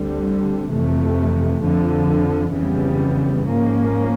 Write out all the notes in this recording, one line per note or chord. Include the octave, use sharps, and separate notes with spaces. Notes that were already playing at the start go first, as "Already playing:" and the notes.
Already playing: D2 D3 G3 C4
F2 C3 E3 A3
F2 D3 F3
F2 C#3 E3 G3 B3
G#2 F3 A#3 C#4